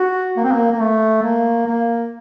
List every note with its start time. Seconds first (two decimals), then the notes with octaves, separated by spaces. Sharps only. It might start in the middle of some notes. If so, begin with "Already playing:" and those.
Already playing: F#4
0.37 A#3
0.44 C4
0.52 A#3
0.72 A#3
0.80 A3
1.23 A#3
1.66 A#3